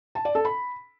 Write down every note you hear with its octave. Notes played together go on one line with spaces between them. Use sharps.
A5
D5
A4
B5